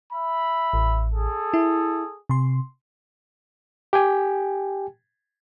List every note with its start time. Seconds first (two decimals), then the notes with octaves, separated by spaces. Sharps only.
0.13 E5 B5
0.73 A1
1.12 G#4 A4
1.54 E4
2.29 C3 C6
3.93 G4 G5 G#5